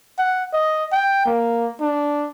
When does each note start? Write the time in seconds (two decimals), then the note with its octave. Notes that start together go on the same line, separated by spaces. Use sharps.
0.18 F#5
0.53 D#5
0.92 G5
1.26 A#3
1.81 D4